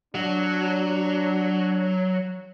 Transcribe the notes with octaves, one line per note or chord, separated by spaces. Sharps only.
F#3 D4